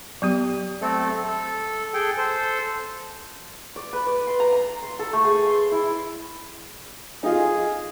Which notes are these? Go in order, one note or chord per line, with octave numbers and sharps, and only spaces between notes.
F#3 B3 G4
A3 C4 A4
A4
G#4 A4 G5
A4 C5
D5
B4
D5
C6
A#5
A#5
C6
A4
A3
G#4
C6
E4
D#4 F4 G#4